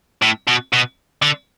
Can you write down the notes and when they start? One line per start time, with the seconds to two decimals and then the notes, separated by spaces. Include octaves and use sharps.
0.22 A2
0.48 B2
0.73 B2
1.22 D3